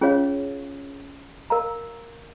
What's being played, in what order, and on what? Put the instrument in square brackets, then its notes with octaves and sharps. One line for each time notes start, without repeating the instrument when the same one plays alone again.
[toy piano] C#4 F4 G#4 C#5 F5
A#4 F5 A#5